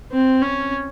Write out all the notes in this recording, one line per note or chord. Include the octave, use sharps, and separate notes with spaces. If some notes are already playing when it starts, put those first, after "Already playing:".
C4
C#4